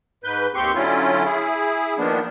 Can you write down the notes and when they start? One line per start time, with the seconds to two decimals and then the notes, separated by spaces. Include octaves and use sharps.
0.24 G#2 B4 G6
0.55 D#2 C4 G4 C6 C#6
0.75 D3 F#3 C#4 E4 F4
1.25 E4 G#4
1.98 D#3 F3 A#3 B3 D4